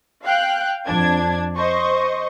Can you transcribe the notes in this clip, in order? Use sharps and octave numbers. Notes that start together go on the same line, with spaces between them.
F5 G5 F#6
F2 D4 G#6
C5 D#5 C#6